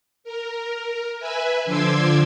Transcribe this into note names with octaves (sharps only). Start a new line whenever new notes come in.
A#4
B4 E5 G#5
D3 F3 C6 D6 E6 G#6